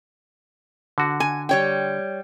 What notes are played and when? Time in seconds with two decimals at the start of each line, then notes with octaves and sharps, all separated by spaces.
0.98 D3 F#4
1.20 G#5
1.49 G3 C#5 G5